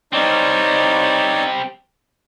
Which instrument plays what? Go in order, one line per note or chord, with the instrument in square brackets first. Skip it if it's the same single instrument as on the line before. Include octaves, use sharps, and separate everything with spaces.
[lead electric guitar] G3 C4 [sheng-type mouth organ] D#4 C#5 D5